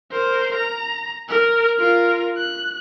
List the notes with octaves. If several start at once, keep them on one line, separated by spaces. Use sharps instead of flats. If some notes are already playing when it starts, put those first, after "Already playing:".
A#4 C5
A#5
A#4
F4 A#4
F#6